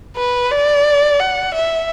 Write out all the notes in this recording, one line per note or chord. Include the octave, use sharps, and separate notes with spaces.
B4
D5
F#5
E5